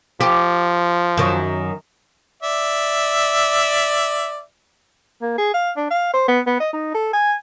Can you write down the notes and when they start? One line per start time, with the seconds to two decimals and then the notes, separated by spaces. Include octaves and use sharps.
0.20 F3 G4
1.17 F#2 D#3
2.42 D5 E5
5.22 A#3
5.38 G#4
5.54 F5
5.77 D4
5.90 F5
6.13 C5
6.28 B3
6.47 B3
6.60 D#5
6.73 D#4
6.94 A4
7.13 G#5